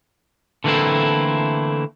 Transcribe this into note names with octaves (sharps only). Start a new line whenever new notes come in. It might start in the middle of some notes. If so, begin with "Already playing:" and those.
D3 E3 A3 A#3 C4 E4